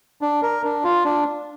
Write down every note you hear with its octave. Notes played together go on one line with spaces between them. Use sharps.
D4
A#4
D4
F4
D4